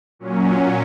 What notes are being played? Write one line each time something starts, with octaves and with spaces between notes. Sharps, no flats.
A#2 F#3 C#4